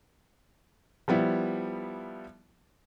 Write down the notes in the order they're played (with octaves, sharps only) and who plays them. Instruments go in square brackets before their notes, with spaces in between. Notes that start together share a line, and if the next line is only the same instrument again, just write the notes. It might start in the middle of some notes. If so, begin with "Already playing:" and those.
[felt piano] F3 G3 B3 E4